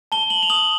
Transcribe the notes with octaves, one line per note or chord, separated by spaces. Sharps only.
A5 G7
F#7
F7
D#6 F#7